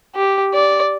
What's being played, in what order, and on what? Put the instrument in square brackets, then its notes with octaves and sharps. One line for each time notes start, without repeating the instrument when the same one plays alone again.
[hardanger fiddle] G4
D5